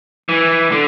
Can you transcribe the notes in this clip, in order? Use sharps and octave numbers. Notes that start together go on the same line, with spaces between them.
E3
D3